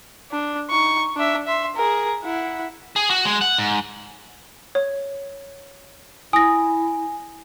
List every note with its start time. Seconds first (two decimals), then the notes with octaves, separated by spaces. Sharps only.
0.31 D4
0.70 D#4 C#6
1.16 D4 E5
1.47 E5 C6
1.76 G#4 A#4
2.24 E4 F#5
2.96 G#4
3.10 F#4
3.25 G#3
3.41 F#5
3.58 G#2
4.75 C#5
6.33 E4 G#5 D#6 A#6